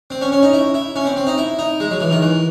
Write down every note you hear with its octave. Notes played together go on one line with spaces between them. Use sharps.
C4
C#4
C#4
D#4
E4
E4
C#4
C4
C4
D#4
E4
D#4
G#3
F#3
E3
D#3
E3